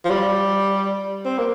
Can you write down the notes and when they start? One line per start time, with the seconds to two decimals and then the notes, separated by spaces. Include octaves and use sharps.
0.05 F3
0.10 G3
1.25 C4
1.38 A#3